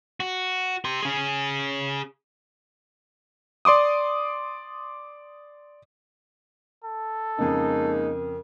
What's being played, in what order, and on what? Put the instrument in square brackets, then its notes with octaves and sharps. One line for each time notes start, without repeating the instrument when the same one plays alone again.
[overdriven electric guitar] F#4
G4 C6
C#4 G#4
[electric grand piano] D5 C6 D6 D#6
[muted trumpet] A4
[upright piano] F2 C#3 [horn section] G#3 A#3 D#4 [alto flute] A#4